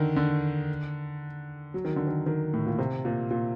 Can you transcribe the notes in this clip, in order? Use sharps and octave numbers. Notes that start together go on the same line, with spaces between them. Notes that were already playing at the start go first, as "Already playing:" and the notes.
Already playing: D3 D#3
D3
F#3
D#3
D3
D#3
D#3
A2
A#2
C3
A#2
A#2